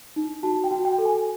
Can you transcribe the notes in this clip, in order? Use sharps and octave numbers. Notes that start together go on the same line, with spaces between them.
D#4
F#4 A5
G5
F#4
G5
A4
G#5